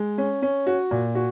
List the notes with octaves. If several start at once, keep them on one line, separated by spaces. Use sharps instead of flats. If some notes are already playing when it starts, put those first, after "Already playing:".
Already playing: G#3
C#4
C#4
F#4
A#2
F#4